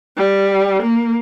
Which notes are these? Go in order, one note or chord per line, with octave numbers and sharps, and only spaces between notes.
G3
A#3